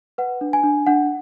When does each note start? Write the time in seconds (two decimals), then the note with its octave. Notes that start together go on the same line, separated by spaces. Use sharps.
0.18 B4 F#5
0.41 D4
0.53 G#5
0.63 D4
0.87 D4 F#5